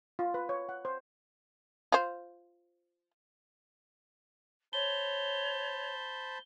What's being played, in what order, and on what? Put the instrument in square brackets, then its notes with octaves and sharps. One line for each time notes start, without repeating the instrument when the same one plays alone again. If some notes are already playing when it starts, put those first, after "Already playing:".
[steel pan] F4
B4
C#5
F#5
C5
[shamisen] F4 C5
[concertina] C5 A5 B5 [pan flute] C#5 [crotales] G7